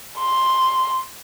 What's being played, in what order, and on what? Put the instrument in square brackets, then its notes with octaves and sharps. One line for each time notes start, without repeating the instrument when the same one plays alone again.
[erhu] C6